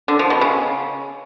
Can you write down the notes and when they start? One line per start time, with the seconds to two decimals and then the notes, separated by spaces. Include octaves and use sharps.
0.08 D3
0.19 F3
0.30 B2
0.41 C#3